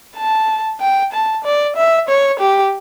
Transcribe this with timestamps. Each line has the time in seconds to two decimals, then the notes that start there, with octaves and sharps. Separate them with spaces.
0.16 A5
0.81 G5
1.13 A5
1.45 D5
1.77 E5
2.09 C#5
2.40 G4